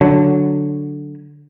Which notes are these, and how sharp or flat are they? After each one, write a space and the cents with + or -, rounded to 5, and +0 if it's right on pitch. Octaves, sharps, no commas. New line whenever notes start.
D3 +0 F#3 +0